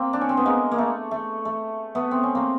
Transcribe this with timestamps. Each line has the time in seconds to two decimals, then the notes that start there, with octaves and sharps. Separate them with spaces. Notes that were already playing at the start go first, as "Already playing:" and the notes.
Already playing: A#3 C4
0.13 D4
0.21 C#4
0.29 C4
0.37 B3
0.45 G#3 A#3
0.71 A#3
0.78 A3
1.11 A3
1.45 A3
1.95 A3 B3
2.11 C4
2.23 C#4
2.35 A#3 C4